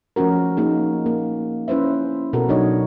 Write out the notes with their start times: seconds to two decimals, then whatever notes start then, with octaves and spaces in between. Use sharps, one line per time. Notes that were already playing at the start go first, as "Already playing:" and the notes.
0.16 F3 A3 C#4 F#4 A#4
0.57 A#3 D#4 G#4
1.06 A#3
1.68 C#4 E4 B4 C5 E5
2.33 B2 B3 F#4 A4 A#4
2.49 F#3 D4 D#4 C#5 D#5